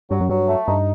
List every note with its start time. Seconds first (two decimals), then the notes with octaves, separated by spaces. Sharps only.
0.11 G2 F#3
0.21 F#2
0.29 G2 F#3
0.48 A3
0.67 G2 D#4